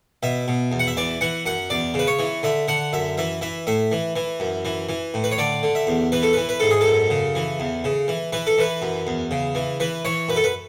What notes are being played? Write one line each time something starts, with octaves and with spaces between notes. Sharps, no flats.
B2 E5
B2
E2
F#5
E5
E3 D5
E3 F#5
F#2 F#5
E2 D5
C#3 B4
C#5
E3
D3 E5
D3 F#5
F#2 E5
E3 E5
E3 E5
A2 E5
E3
E3
F#2
E3
E3
A2
B4
C#5
D3 D5
D3
E5
E2
E3 B4
A4
E3 B4
B4
G#2 A4
G#4
A4
F#2
C#3
E3
E2
C#3
E3
E3 B4
A4
E3 B4
F#2
E2
C#3
E3
E3 B4
E3 C#5
F#2 B4
A4
B4